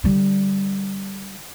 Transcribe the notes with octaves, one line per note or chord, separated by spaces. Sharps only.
D3 G3